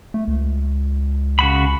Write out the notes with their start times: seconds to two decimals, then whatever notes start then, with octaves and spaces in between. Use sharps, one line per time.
0.14 A3
0.28 C#2
1.39 C#3 F#4 B5